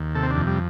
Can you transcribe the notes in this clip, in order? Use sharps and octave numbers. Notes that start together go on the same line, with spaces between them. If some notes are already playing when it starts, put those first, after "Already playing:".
Already playing: D#2
C3 A4
C4
D4
F2
G3